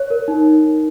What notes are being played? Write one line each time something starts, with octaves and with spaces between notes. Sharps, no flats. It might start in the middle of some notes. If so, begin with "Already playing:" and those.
Already playing: C#5
A#4
D#4